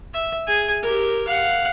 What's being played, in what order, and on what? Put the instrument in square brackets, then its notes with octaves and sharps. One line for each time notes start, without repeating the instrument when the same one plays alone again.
[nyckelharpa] E5
G#4 G#5
G4 A#4
F5 F#5